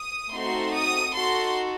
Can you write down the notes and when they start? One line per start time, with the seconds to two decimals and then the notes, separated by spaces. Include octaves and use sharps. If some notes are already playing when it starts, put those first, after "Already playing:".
Already playing: D#6
0.33 A3 C4 D#4 F#4 A4 C6
0.73 D#6
1.13 D#4 F#4 A4 C6